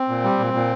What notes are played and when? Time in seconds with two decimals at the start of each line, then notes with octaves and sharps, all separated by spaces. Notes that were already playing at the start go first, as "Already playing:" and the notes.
Already playing: C4
0.09 A#2
0.24 G3
0.39 A#2
0.54 A#2